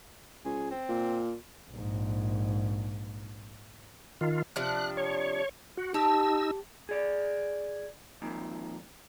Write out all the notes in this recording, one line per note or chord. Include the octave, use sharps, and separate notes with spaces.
C#2 G#4
C4
A#2
A#1 G#2
D#3 F4
C3 F3 D4 F#6
C#5
F#4
D#4 G4 A5 E6
G#4 D5
F2 A#2 D#3